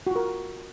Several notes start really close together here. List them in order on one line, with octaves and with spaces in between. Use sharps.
F#4 F4 A#4